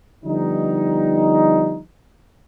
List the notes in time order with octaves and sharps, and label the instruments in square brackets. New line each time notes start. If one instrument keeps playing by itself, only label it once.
[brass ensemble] D3 F3 G3 B3 D#4